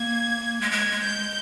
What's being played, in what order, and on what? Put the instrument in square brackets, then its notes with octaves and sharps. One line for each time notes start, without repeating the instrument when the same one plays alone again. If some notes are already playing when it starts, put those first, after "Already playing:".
Already playing: [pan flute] A#3 [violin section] G#6
[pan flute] G#3 [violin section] G#6
[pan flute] G#3
G#3
[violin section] G6